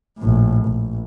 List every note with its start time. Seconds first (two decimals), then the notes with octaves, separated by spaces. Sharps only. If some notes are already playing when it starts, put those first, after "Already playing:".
0.18 A#1 A2
0.66 A#1